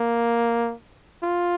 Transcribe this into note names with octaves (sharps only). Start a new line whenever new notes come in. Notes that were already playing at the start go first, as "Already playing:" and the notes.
Already playing: A#3
F4